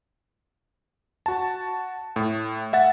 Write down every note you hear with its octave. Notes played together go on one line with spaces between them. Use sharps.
F#4 A5
A2
E5 F#5 A6